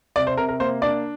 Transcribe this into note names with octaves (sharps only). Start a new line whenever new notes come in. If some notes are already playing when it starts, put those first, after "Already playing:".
C3 D5
C5
C3 A#4
A#4
A#3 C5
D4 D5